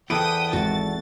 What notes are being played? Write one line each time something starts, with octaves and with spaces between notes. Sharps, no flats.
E2 A4 B4 G5 D6 D#6 D7
G#1 F#4 A6